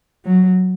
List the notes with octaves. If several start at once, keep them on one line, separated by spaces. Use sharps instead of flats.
F#3